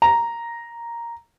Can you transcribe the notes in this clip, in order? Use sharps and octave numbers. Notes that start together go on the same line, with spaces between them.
A#5